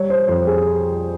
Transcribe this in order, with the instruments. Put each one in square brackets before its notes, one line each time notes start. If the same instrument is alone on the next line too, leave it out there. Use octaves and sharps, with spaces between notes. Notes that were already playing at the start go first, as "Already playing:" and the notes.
Already playing: [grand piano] G3 C#5
C5
F2 C5
G#4